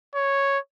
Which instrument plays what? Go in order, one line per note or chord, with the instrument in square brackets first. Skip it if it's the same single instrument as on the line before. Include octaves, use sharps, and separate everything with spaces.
[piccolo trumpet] C#5